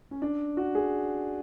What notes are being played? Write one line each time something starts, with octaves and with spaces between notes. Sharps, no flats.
C#4
D4
F#4
G#4